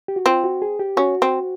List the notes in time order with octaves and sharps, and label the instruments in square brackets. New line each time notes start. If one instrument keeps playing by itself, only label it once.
[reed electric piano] G4
F#4
[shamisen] C4 [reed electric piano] F4
[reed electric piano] F#4
G#4
G4
[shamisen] C#4 [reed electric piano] F#4
[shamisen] C4